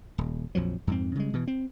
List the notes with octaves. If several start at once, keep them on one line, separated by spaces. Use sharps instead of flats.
D#1
A#1 F2 F3 F#3
F2 G#2 C4
C#3 G3 G#3
B2 E3
C4